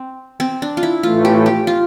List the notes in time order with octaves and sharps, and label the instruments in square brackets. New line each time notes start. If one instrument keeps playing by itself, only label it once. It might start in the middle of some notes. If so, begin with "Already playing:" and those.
Already playing: [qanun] C4
C4
D4
F4
E4
[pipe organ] A2 E3 A3 [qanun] F4
[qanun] G4
G4
F4